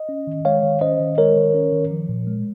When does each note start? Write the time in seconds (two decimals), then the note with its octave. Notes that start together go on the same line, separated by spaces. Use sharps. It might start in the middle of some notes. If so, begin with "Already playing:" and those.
Already playing: D#5
0.09 C#4
0.27 D#3
0.45 G#3 C#5 F5
0.63 D#3
0.81 C#4 C5 D#5
0.99 D#3
1.18 G#3 A#4 C#5
1.36 D#3
1.54 C#4
1.73 D#3
1.91 F3
2.09 A#2
2.27 G#3